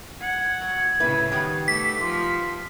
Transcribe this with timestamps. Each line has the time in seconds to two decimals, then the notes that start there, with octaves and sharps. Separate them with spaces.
0.21 F#5 G#6
0.61 F#3
1.00 A2 C#3 E4 B4
1.32 D#3 G3 B3
1.68 A3 A4 D6 B6
2.01 F3 C6